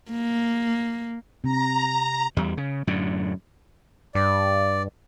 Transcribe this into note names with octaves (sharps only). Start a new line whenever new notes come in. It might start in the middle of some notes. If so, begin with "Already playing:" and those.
A#3
C3 A#5
E2 G3
C#3
F#2 A2 D3
G2 D5